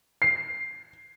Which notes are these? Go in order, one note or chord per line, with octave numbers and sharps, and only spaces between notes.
C7